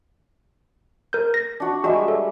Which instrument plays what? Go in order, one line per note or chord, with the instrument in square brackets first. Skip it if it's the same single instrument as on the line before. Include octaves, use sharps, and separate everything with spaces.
[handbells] A#4 G6
A#6
[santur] D4 F#4
[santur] G3 G#3 E5 [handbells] F#4
[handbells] A4